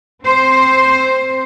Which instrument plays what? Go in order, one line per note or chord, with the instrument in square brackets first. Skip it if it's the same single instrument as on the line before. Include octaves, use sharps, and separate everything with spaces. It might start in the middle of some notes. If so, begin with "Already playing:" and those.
[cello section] C4 C5